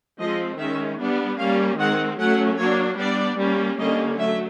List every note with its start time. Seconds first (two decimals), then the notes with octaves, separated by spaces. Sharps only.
0.19 F3 G#3 C4 D#5
0.58 D#3 G#3 C#4 E5
0.98 G3 B3 D4
1.38 G3 A#3 C#4 F5
1.78 D#3 G#3 C4 F#5
2.19 F#3 A3 C#4 F#5
2.59 F#3 A#3 D4 C#5
2.98 G3 B3 D4 D5
3.38 G3 A#3 C#4
3.78 D3 G3 A#3 C#4 D#5
4.18 F#3 A3 E5